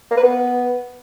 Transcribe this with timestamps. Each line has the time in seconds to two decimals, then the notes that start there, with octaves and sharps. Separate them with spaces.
0.11 A#3
0.17 B4
0.23 B3